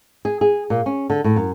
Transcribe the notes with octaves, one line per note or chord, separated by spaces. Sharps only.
G#4
G#4
A#2
C#4
D3
A2
F#2